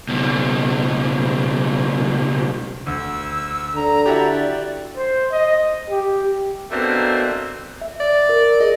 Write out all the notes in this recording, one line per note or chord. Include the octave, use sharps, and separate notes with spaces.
C#2 B2
D2 E6
D3 A#5
E4 F#4 G4 D5
C5
D#5
G4
B2 D3 A3 A#3 C4
E5
D5
A#4
G#4 D#5